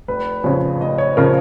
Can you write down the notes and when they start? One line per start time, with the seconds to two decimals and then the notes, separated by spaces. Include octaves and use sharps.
0.08 F1 B4
0.44 F2 C#3 F3 C#5
0.81 F1 D#5
0.98 C#5
1.17 C#3 F3 A#4